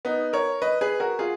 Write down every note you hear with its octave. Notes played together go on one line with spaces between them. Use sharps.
B3 D#4
A#4 C#5
B4 D#5
G#4 B4
F#4 A#4
F4 G#4